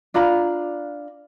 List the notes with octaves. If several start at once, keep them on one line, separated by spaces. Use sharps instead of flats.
D4 F4 A#5 B5